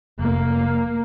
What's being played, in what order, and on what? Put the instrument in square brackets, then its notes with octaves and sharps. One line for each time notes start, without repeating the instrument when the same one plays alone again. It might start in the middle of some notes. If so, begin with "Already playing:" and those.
[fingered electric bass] F1 [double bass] A#3